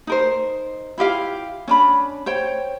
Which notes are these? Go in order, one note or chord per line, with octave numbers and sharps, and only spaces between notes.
D#4 A#4 C5
E4 F4 G4 F5
C#4 D4 B5
C5 C#5 G5